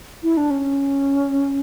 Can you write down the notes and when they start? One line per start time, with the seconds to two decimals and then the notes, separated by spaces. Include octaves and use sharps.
0.23 E4
0.37 D4
0.51 C#4